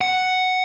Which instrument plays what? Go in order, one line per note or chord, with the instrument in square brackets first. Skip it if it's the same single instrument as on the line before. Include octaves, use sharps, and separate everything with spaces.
[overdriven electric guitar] F#5